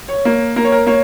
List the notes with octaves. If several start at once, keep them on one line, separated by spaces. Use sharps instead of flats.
C#5
A#3
A#3 A#4
C#5
A#4
A#3 C#5